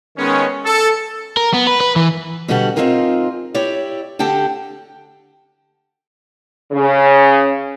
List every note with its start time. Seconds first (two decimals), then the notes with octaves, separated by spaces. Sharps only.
0.18 D#3 G#3 B3 C#4
0.65 A4
1.37 A#4
1.54 B3
1.67 B4
1.81 B4
1.96 E3
2.48 B2 D3 G3 F#4 G4 F#5
2.76 C4 C#4 D#4 F4 G#4 A#4
3.54 E4 G4 C#5 D5
4.19 D2 D3 G4 F#5 G5 A5
6.72 C#3